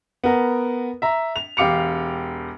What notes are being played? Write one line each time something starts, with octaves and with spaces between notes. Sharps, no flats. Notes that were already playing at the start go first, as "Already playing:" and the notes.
B3 A#4
E5 A#5
F7
E1 G4 F5 D6 C#7 F7